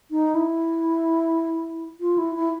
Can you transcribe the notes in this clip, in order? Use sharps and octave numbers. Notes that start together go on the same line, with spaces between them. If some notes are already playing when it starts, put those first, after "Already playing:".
D#4
E4
F4
E4
E4